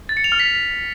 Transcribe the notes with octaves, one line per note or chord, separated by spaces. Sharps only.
A6
C#7
F7
F6
B6